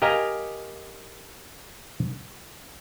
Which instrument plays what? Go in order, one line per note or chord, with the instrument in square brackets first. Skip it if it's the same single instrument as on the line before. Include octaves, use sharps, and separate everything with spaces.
[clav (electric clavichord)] G4 A#4 D#5 F5 G#5 A#5